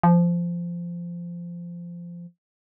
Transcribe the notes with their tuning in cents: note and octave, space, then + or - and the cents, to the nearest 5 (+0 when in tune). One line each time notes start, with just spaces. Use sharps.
F3 -15